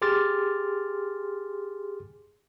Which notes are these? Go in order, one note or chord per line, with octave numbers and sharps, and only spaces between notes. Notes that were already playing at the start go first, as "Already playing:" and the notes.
G4 G#4 C6 D6 F6 A6